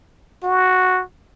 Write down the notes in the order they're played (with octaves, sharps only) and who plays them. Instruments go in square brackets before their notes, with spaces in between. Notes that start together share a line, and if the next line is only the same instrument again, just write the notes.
[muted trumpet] F#4